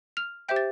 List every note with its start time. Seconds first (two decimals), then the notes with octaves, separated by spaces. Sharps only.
0.17 F6 F7
0.49 G4 C5 E5 G5 G6
0.56 A6